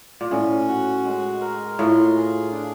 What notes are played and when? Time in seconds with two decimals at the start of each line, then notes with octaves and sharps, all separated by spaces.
0.21 A#2
0.31 A2 C#4
0.68 F#4
1.05 G#3
1.41 A#4
1.79 A2 F4
2.16 G#4
2.52 D4